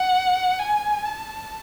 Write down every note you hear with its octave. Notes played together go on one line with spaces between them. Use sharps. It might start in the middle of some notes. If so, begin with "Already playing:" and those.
Already playing: F#5
G#5
A5